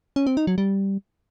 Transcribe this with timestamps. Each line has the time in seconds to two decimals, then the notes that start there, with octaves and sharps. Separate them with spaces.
0.16 C#4
0.27 C4
0.37 D#4
0.47 F#3
0.58 G3